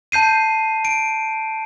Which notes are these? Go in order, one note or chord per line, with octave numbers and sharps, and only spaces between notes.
A5 G6 C7 D#7
D7